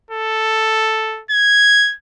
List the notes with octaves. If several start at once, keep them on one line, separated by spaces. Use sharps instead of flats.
A4
G#6